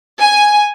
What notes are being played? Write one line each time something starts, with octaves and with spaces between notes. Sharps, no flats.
G#5